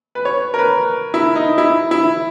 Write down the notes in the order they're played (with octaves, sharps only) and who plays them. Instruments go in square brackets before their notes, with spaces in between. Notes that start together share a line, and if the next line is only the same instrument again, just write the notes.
[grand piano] B4
C#5
A#4
B4
E4
D#4
E4
E4